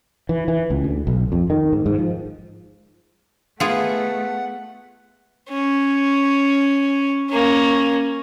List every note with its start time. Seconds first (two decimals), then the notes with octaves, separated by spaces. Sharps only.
0.29 E3
0.48 E3
0.70 C#2
0.84 D2
1.07 B1
1.32 F2
1.50 D#3
1.72 G#2
1.86 G#2
1.99 F3
3.60 A3 B3 F4 G#4 F#5
5.49 C#4
7.30 A#3 C#4